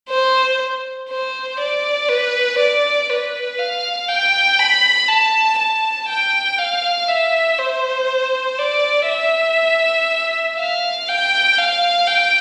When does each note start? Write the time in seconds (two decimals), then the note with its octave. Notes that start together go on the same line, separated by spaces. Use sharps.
0.09 C5
1.10 C5
1.60 D5
2.09 B4
2.59 D5
3.09 B4
3.59 F5
4.09 G5
4.59 B5
5.08 A5
5.58 A5
6.09 G5
6.58 F5
7.09 E5
7.58 C5
8.58 D5
9.07 E5
10.58 F5
11.08 G5
11.58 F5
12.07 G5